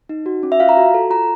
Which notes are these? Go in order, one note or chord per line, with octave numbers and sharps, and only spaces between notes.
D#4
F#4
C#4
E5
F4 F5
A#5
F#4
A4
F4 A#5